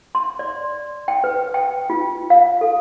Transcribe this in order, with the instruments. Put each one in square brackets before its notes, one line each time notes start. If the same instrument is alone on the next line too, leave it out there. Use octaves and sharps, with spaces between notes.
[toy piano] C6
D5
G5
B4
G5
F4
F5
A4